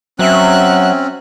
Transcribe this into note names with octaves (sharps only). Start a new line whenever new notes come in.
F#3 C4 C#4 E5 F#6